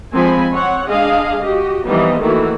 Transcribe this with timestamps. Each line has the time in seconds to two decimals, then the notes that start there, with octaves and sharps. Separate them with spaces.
0.13 F3 G#3 C4 G#5 B5
0.53 C4 C#5 F#5
0.88 G#3 D4 G#4 D#5 F5
1.42 F#4 G4 D#5
1.86 E3 F3 G3 B3 D#4 D#5
2.21 D#3 E3 A3 A#3 E4 F#4